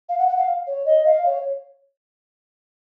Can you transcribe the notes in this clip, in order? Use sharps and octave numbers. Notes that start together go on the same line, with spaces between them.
F5
F#5
F#5
F5
C#5
D#5
F5
C#5